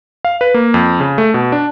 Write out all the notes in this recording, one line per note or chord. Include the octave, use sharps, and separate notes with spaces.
F5
B4
A#3
F2
C#3
A3
B2
D4